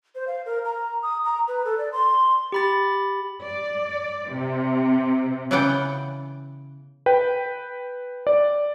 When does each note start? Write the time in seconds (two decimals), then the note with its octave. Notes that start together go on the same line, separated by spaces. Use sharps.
0.15 C5
0.27 F5
0.46 A#4
0.65 A#5
1.03 D#6
1.25 A#5
1.48 B4
1.65 A4
1.78 D5
1.92 C6
2.52 G4 B5 A6
3.44 D5
4.31 C3
5.51 C#3 E3 B3 D5 F#5 G5
7.06 B4 G5
8.27 D5